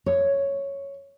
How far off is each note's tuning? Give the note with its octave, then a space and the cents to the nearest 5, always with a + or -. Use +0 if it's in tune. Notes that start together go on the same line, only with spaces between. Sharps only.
C#5 +0